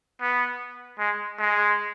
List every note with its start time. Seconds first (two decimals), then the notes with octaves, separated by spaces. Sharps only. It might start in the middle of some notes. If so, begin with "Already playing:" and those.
0.21 B3
0.99 G#3
1.38 G#3